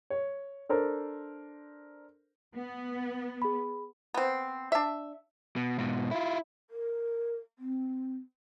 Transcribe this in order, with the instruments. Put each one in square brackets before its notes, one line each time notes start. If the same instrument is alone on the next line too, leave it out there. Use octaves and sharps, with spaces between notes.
[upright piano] C#5
D4 A4 A#4 C5
[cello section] B3
[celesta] G#4 B5
[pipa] B3 C4
D4 E5
[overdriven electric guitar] B2
G#2 B2
E4 F4
[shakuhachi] A#4
C4